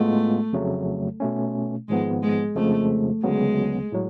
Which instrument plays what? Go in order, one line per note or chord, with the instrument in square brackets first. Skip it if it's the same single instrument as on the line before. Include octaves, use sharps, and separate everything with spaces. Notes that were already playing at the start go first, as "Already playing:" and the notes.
Already playing: [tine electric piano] A2 G#3 B3 F4 [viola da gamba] A3
[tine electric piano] F2 C#3 F#3 A3
B2 A3 C#4
[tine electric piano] G#1 G#2 F3 B3 [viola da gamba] G#3
[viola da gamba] G#3
[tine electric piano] F2 C#3 F3 G#3 [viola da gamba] A3
[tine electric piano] D2 C#3 F#3 B3 [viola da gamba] G#3
[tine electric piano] A2 F#3